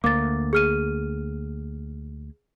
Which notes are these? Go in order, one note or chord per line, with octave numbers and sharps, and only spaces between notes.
D2 A#3 D6 A6
G#4 F6 D#7